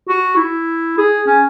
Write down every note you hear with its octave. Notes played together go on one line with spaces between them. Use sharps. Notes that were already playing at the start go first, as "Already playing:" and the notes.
F#4
E4
G#4
C#4